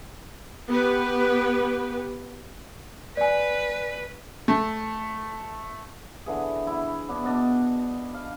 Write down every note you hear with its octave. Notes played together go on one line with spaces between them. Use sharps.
B3 G4 B4
B4 D5 G#5
A3
D3 E3 G#4
E4
B3 D4
B2 D4 D#5
F5